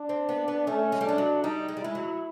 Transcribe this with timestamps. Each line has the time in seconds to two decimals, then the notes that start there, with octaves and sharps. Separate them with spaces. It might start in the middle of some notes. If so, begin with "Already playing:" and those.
Already playing: D4
0.09 C4
0.29 B3
0.48 B3
0.67 A3 C#4
0.92 G#3
1.01 G3
1.05 G#3 D4
1.18 F#3
1.44 G3 D#4
1.69 G#3
1.77 G3
1.82 G#3 E4
1.95 F#3